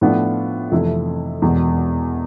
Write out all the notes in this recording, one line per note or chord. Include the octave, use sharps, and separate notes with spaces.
A2 F3 B3 D4 F4
F2 C3 E3 A3 E4
E1 E2 B2